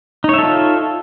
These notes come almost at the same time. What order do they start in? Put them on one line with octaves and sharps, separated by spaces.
D#4 C#5 E5 A4 F4